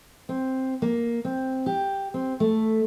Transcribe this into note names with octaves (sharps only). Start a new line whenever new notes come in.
C4
A#3
C4
G4
C4
A3